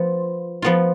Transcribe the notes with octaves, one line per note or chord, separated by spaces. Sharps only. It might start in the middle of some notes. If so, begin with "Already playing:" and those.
Already playing: F3 B3 F4
F3 B3 F4